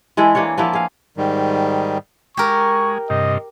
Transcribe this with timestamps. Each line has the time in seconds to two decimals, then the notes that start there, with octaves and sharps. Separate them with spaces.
0.17 E3 G#3 E4 A4
0.35 E3 A#3 D4 C#5
0.58 F3 A#3 B3 E4
0.73 G#4 F5
1.17 G#2 D#3 G3
2.37 G#3 G4 A#4 C#6
3.10 G2 C3 D#5